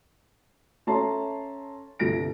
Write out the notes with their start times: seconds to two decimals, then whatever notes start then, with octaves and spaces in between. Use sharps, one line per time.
0.87 C#4 A4 E5 A5 A#5 C6
1.99 G1 C2 A4 A#6 D7